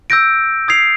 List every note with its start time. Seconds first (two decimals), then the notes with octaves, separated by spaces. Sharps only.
0.10 E6 G6 A#6 D7
0.68 D#6 G#6 C7 F7